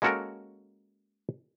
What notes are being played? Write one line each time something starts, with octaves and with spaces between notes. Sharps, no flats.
G#3 A#3 C#4 F#4 A4 A#4